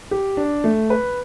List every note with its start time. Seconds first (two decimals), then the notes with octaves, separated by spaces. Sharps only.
0.11 G4
0.37 D4
0.64 A3
0.90 B4